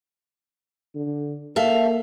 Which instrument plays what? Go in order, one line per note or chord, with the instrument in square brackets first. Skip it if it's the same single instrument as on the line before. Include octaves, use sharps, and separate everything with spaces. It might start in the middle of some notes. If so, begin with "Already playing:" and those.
[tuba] D3
[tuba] A#3 [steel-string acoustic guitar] A4 E5 F5